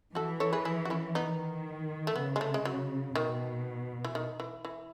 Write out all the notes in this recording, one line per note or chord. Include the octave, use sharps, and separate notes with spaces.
E3 F#4 A4
A4 C#5
G#4 B4
E4 G#4
F#4
C#4 E4
D#3 B3 D#4
A3
C#3 B3
G#3
A3
G#3
F#3
B2 D#3
E3
D#3
E3
E3